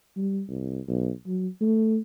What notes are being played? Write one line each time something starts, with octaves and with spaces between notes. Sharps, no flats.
G3
C2
B1
F#3
A3